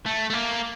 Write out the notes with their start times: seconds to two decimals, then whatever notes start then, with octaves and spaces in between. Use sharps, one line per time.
0.06 A3
0.30 A3
0.34 A#3